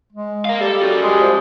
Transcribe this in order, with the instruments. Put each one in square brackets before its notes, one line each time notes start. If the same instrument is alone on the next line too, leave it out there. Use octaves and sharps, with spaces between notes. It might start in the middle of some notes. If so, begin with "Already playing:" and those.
[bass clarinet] G#3
[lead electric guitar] A#4 F5
[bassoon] G3 [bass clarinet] G4 [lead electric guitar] A4
[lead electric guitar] C#4 F#4
[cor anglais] G#3
[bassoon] F3